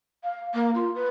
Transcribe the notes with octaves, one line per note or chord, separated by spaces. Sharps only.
F5
A#3
F4
B4